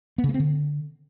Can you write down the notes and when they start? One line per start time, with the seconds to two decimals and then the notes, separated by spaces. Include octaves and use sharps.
0.18 B3
0.24 C#3
0.29 A#3
0.34 C4
0.40 D3